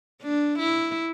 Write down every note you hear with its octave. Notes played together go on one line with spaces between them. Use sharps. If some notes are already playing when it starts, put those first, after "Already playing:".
D4
E4